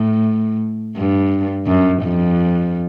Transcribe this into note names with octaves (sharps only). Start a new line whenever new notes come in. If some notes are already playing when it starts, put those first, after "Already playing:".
Already playing: A2
G2
F#2
F2